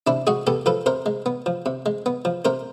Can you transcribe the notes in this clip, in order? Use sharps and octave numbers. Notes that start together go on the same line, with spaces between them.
C3 D4 E4
G#3 F#4 G#4
B3 G4 A4
F3 A4 B4
C3 A#4 C5
G#3
B3
F3
C3
G#3
B3
F3
C3 A#4 C5